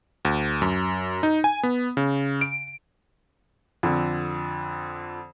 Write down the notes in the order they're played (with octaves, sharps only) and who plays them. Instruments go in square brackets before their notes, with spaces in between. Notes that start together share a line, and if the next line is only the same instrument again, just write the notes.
[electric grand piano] D2
F#2
D#4
G#5
B3
C#3
D7
[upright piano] F2 D3